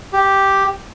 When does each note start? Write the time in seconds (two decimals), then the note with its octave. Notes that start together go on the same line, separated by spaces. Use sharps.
0.13 G4